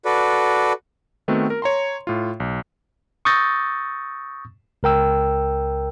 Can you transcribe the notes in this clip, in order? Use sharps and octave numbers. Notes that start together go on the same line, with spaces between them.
F#4 A4 B4 D5
D#3 A3 B3 C4 F#4
A#4
C#5 A#5 C6
A2 F4
B1
C#6 D#6 E6 G6 A6 A#6
C#2 A#4 G5 E6